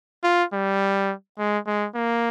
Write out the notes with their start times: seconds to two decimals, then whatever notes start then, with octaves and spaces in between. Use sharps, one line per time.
0.24 F4
0.53 G3
1.39 G#3
1.67 G#3
1.96 A#3